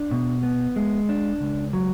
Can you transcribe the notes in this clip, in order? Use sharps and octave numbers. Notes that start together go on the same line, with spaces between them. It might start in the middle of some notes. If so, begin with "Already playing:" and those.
Already playing: D4
B2
B3
G#3
D4
C#2
F#3